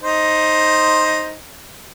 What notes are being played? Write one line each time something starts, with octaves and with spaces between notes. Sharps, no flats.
D#4 C5